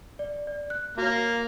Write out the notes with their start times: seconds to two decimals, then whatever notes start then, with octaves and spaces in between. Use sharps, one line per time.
0.19 D5
0.47 D5
0.70 F#6
0.98 A#3 F#4 C#5